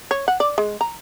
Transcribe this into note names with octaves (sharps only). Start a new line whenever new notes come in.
C#5
F#5
D5
G#3
A#5